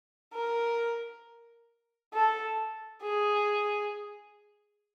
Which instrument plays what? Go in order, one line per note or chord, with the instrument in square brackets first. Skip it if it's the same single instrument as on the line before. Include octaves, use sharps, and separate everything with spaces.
[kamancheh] A#4
A4
G#4